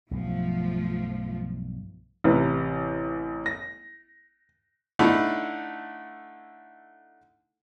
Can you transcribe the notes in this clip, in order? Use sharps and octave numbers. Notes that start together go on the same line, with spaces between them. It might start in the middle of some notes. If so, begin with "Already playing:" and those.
B1 G2 F3 A3
A1 C3 B4
A#6
D3 A3 D#4 E4